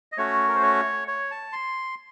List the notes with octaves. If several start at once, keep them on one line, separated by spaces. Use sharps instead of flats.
D#5
A3 C#4 F#4 C#5
A#4
C5
C#5
C#5
A5
C6